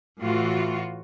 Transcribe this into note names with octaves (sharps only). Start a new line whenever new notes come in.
A2 E3 F4 F#4